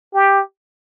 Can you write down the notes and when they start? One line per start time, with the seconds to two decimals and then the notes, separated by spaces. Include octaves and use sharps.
0.14 G4